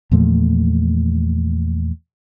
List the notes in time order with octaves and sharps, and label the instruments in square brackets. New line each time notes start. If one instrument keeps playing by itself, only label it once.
[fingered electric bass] E2 A#2 F3 A3